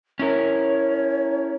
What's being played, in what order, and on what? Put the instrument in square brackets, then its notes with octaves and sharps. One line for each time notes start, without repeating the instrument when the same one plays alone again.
[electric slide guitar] C#4 E4 A#4 [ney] C#5